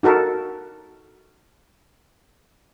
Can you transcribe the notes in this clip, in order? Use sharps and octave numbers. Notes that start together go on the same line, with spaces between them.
D#4 F#4 A4 A#4